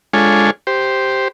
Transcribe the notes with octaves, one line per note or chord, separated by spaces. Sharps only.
G#3 D4 F4 A4 C#5 G#5
G4 C5